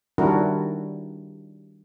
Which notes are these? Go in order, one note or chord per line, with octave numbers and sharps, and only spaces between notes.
D#3 G3 D4 E4 F#4 A#4